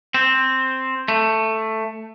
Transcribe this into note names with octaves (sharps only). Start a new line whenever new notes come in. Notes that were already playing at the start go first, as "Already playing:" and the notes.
C4
A3